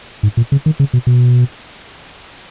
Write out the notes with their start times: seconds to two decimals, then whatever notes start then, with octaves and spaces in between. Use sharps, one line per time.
0.23 G#2
0.37 A#2
0.52 C#3
0.66 D#3
0.80 C#3
0.93 B2
1.07 B2